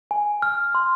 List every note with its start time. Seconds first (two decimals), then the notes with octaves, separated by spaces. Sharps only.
0.11 G#5
0.42 F6
0.75 C6